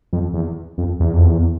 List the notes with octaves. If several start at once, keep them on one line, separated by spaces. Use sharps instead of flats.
F2
E2
F2
E2
F2
E2